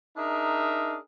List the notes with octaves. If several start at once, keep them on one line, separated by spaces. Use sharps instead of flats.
D4 D#4 G#4 A#4 E5